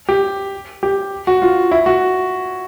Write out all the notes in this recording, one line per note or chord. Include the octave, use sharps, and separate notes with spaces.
G4
G4
F#4
F4
E4
F#4